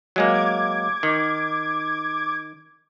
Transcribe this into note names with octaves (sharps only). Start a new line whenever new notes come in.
F#3 G#3 A#3 D6 G#6
D#3